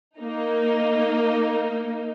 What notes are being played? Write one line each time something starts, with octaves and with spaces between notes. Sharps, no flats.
A#3 D#4